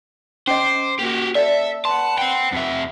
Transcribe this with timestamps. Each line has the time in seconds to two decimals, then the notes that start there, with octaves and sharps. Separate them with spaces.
0.47 C#4 C5 D#5 D6
0.99 A#3 F#4 G4
1.35 A4 D5 E5
1.85 B4 F#5 A5 C6
2.18 C5 G5
2.53 F2 E5